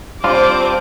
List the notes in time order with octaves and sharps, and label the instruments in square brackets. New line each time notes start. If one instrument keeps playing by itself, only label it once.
[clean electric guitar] G3 D4 F4 [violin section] C4 C5 D6